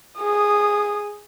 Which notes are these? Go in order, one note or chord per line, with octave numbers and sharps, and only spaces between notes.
G#4 D#6